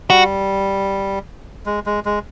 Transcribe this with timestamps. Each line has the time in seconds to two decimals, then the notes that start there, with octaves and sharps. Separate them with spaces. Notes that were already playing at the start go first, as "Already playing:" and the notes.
0.10 G3 F#4
1.66 G#3
1.86 G#3
2.05 G#3